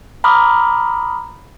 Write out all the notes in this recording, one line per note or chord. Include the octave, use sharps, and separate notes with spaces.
A#5 B5 D6 D#6 F6